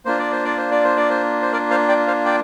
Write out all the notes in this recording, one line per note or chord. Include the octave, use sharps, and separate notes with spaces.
A#3 D4 F4 C5
D5
C5
D5
C5
D5
C5
D5
C5
C5
A#4 D5
C5 F5
D5 G5
C5 F5
D5 G5